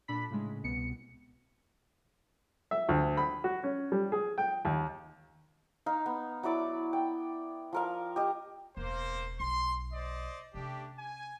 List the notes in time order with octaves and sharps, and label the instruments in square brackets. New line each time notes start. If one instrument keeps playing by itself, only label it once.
[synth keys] A#2 D4 A4 B5 B6
A2 C#3 G#3
C2 B2 B3 C#7
[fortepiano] E5
D2
B5
F#4
C#4
G3
G#4
G5
D#2
[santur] D#4 F5
B3
F#3 E4 D5 D6
G5
F3 A#4 F5
G4 D#5
[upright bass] E1 C#2 [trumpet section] A#3 C5
[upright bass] B1 [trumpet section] C6
[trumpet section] C5 D5 D#5
[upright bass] C3 C#4 [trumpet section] A3 D4 G4
[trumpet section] G#5